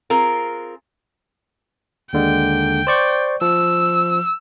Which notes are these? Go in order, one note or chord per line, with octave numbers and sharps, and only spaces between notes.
C4 F4 G#4 A#4
D#2 D3 G#3 G5
C5 D5 C#6
F3 E6